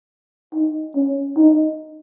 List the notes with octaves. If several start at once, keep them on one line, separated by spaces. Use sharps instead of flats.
D#4
C#4
D#4